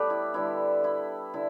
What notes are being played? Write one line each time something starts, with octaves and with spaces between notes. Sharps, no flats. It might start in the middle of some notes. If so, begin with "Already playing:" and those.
Already playing: A2 G3 B3 G4 A4 B4 D5
E4
D3 G3 B3 E4
E4
D3 E4